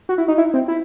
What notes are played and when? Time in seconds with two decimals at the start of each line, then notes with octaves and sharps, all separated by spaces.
0.09 F#4
0.18 E4
0.28 D#4
0.38 E4
0.54 C4
0.68 E4